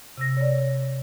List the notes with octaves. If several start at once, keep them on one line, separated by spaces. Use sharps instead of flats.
C3 E6 A#6
C#5 D5